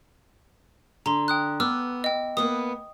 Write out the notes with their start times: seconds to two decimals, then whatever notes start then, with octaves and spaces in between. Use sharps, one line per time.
1.06 D3 A#5 C6
1.28 G5 D#6 F#6
1.60 B3 D6 E6 F6
2.04 D#5 G5
2.37 A#3 B3 B4 D#6